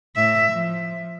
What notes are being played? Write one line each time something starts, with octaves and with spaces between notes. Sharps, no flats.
A2 E5
F3